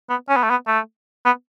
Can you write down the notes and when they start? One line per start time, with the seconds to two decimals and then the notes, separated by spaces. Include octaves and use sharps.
0.10 B3
0.29 C#4
0.36 B3
0.43 A3
0.50 B3
0.67 A3
1.25 B3